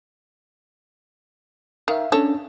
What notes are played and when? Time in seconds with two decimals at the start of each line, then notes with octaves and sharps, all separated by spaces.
1.88 D#3 E5 F5
2.12 C#4 D4 A4 C#5